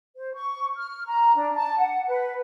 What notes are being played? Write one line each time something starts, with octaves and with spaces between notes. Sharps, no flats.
C5
C#6
F6
A#5
D4
A5
F#5
B4